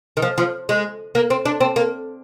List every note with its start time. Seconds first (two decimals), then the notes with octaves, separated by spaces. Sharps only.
0.17 D#3
0.22 F3
0.38 F3
0.69 G#3
1.15 A#3
1.30 C4
1.45 D4
1.61 C4
1.76 A#3